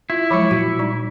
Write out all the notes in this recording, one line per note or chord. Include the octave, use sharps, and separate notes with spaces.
E4 F4
F3 F#3 G#3 B5 D6 C#7
A#2 F#4
G3 D#4